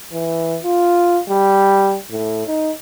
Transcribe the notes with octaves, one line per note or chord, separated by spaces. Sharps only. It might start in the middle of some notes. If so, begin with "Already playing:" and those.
E3
F4
G3
A2
D#4